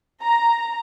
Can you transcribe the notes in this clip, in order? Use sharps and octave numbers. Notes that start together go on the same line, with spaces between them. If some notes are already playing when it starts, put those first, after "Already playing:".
A#5